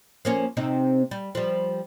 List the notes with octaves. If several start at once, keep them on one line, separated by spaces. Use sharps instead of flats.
F3 A#3 C#4
C3 C4 D#4
G3
F3 G3